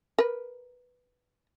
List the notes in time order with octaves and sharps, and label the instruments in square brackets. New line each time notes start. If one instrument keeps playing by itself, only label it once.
[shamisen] A#4 B4